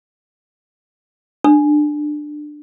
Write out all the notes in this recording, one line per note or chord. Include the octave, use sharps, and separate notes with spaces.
D4